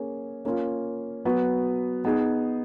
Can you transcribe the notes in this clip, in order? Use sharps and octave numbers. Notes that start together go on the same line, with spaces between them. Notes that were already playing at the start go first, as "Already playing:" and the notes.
Already playing: A#3 C#4 G#4
A#3 C#4 F4
F#3 B3 F#4 B4
B3 D#4 G#4